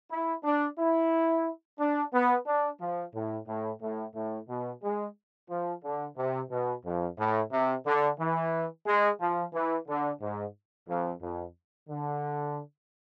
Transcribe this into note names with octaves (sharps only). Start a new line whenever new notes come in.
E4
D4
E4
D4
B3
D4
F3
A2
A2
A2
A2
B2
G#3
F3
D3
C3
B2
F2
A2
C3
D3
E3
G#3
F3
E3
D3
G#2
F2
F2
D3